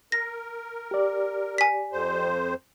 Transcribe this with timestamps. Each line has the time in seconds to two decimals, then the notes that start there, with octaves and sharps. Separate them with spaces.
0.12 A#4 A#6
0.91 G4 D5
1.58 G#5 B6
1.92 F2 C5